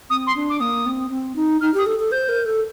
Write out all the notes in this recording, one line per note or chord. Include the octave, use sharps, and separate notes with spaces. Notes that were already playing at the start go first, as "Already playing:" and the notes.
C4 D#6
C6
D4
D6
A#3 D#6
C4
C4
D#4
D#4 F6
G4 D#6
A4
A4
C5 G6
A#4
A4